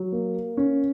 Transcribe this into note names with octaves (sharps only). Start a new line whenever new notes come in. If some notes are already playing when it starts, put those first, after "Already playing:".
Already playing: F#3
A#3
C#4